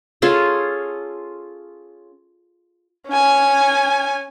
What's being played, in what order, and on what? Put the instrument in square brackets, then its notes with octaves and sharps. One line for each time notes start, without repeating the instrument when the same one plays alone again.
[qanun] C#4 F4 G#4 A4
[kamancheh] C#4 G#5